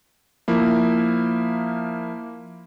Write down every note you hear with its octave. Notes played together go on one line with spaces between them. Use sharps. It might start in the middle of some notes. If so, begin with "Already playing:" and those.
F3 A#3 E4